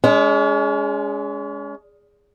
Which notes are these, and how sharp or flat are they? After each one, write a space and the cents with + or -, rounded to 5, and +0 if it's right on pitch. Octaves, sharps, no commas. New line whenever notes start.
G#3 +0 C#4 +40